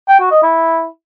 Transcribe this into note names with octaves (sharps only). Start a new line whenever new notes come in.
G5
F#4
D#5
E4